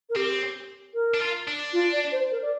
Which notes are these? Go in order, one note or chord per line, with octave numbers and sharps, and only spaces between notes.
A#4
C4 G4
A#4
D4
F4
D4
F4
D5
C5
A#4
D5